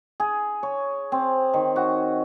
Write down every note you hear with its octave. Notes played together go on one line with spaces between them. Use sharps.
G#4
C#5
C4
D#3
F#4